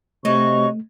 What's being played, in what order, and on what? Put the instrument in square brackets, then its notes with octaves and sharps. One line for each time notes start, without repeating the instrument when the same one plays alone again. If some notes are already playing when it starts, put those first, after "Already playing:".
[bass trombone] C3 [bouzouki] F#3 D#4 [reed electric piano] A3 [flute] C#6